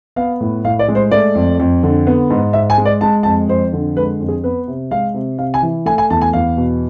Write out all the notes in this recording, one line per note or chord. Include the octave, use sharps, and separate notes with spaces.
B3 F5
A2
A2 F5
D5
G#3
C5
A3 D5
F2
F2
D3
B3
G#2
G#2 E5
G#5
G#3
D5
G#3 A5
F2 A5
F2 C5
D3
G#3 B4
F2
G#4
B3 B4
C3
G#3 F5
C3
C3 F5
G#5
E3
A3 G#5
G#5
E2 A5
G#5
E2 F5
B2